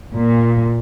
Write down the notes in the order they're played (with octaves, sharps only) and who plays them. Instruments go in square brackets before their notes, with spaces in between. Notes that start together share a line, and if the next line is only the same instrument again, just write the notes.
[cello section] A#2